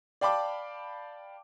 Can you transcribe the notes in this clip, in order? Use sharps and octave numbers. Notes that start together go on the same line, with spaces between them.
D5 F5 G5 A5 B5 D6